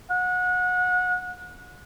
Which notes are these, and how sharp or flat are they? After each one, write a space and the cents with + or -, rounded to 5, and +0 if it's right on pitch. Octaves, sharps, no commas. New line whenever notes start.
F#5 -30